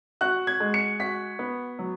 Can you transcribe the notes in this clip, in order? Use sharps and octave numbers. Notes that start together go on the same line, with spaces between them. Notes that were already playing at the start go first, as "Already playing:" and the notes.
F#4 F#6
G#6
G#3
C#7
F#4 B6
B3
F#3